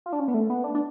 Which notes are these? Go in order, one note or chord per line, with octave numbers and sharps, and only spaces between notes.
F4
D4
C#4
B3
A3
B3
D4
D4